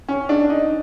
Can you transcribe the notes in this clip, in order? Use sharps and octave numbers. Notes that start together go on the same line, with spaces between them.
C#4
D4
D#4